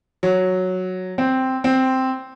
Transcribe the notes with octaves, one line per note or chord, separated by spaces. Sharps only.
F#3
C4
C4